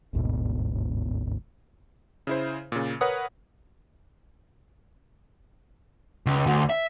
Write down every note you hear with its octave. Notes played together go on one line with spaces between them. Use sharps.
G1 D2 G#2 B2
C#3 E4 C5
A#2 C#3
A#4 B4 C#5 F#5 D#6
C#2
D2
E5